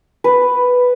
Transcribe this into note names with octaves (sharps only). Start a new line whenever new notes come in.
B4